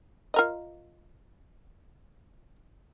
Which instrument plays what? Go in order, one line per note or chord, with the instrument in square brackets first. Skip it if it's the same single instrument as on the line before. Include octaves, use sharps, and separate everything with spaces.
[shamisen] F4 A#4 D#5